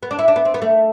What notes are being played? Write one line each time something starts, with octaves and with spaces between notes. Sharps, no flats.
B3
D4
E4
D4
B3
C4
B3
A3